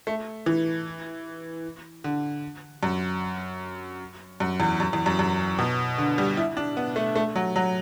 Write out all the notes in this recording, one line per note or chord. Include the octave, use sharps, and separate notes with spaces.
A3
E3
D3
F#2
F#2
E2
F#2
E2
F#2
F#2
B2
D3
G3
E4
D4
B3
A3
A3
F#3
F#3